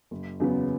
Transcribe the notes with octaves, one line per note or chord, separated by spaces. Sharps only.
F#1
E2 C#3 F#3 B3